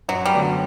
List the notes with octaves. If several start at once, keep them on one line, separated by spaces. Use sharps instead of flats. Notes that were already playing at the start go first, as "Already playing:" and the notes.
F#2 F#3
G3
D3 F#3 B3